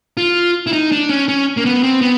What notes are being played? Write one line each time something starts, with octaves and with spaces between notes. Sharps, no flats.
F4
E4
D#4
D4
C#4
C#4
A#3
B3
C4
B3